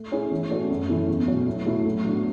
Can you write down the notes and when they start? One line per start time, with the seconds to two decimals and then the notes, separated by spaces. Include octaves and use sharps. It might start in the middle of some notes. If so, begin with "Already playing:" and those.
Already playing: A3
0.12 C#4 E4 G#4 C#5
0.31 E3
0.50 A3 C#4 F#4 C#5
0.70 F#2
0.89 E3 A3 E4
1.08 E2
1.27 B2 F#3 C#4
1.47 A2
1.66 F#3 A3 E4
1.85 A2
2.04 F#3 B3 D4